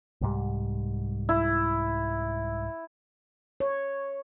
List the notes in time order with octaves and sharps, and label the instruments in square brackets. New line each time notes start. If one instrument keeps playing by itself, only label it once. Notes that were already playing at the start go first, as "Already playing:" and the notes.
[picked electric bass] C2 G#2 G3
[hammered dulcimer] E4
[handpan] C#5